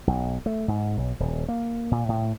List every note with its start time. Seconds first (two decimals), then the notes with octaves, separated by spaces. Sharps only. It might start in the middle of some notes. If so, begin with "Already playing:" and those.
0.07 B1
0.46 A3
0.68 G#2
0.97 B1
1.20 D#1
1.48 A#3
1.91 A#2
2.09 A2